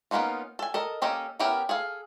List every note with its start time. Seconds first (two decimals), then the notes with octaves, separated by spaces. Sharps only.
0.11 A#3 B3 C#4 D#4 F4
0.59 A4 G#5
0.74 A4 A#4 D#5
1.02 A#3 C#4 G4 A4 D#5
1.39 B3 C#4 E4 G4 A#4
1.69 G#4 A4 F5